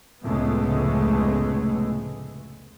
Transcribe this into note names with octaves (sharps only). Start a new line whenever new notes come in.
F1 C#2 A2 G#3 A3 B3